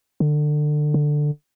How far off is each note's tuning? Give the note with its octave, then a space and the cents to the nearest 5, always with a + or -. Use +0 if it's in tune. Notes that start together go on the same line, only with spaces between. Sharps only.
D3 +25
D3 +10